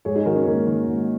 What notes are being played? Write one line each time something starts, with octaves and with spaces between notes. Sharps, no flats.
G#2 G#4 C#5
D#4 G#4
D#3 F#4 A#4
C#4 F#4
G#2 A#3 D#4
D#3
G#2